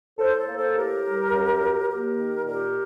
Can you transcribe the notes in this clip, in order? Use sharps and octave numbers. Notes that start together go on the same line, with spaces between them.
A2 A4 C5
A4 C5
A#3
A4 C5
A2 G4 A#4
G3
F#2
F#3
A#3 G4 A#4
D#3
A#2 G4 A#4